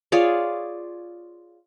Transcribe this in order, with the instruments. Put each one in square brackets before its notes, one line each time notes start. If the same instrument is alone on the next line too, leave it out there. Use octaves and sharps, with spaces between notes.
[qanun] F4 G#4 C#5 D5